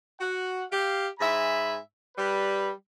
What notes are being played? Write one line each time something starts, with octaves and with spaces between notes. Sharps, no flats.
F#4 F#5
G4 F5
G#2 E5 G#5 B5
G3 B4